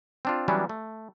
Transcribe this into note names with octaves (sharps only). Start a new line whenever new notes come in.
C4 D4 F4
E3 F#3 G3 B3 C#4 D4
A3